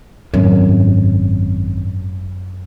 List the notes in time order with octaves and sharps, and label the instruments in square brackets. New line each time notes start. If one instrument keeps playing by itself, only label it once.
[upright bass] G#1 [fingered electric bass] F#2